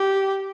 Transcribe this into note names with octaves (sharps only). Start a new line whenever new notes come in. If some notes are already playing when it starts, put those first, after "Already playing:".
Already playing: G4